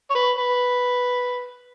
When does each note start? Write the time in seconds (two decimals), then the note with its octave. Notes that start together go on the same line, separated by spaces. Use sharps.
0.10 C#5
0.15 B4
0.37 B4